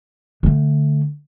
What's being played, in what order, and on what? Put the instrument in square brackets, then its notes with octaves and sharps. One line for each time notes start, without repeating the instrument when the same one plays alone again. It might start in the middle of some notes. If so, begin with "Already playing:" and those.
[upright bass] D3 A3